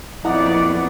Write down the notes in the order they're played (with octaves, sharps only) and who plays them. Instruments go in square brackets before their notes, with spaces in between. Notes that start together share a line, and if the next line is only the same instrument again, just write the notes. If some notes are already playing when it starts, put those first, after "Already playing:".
[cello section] F2 A#2 B3 [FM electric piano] E4 [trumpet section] D5 [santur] D#5 F#5 A#5